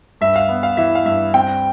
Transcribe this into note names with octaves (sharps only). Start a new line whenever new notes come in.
G2 E5
F5
B3
F5
E3 E5
F5
G2 E5
C4 G5